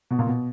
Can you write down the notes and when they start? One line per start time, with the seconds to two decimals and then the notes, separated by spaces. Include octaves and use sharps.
0.11 B2
0.19 A#2
0.27 B2